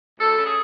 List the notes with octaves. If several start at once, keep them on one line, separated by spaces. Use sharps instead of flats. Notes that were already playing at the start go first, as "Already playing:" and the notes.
D2 A4
C#3
G#4